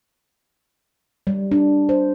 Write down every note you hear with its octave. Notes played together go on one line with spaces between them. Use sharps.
G3
D4
C5